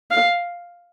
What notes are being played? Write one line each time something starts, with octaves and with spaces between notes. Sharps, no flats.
F5